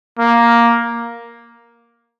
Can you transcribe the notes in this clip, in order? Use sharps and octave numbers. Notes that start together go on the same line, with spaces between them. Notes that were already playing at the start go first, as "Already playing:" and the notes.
A#3